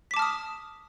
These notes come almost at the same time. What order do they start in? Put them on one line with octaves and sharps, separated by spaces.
B6 D6 A5 F6 D#6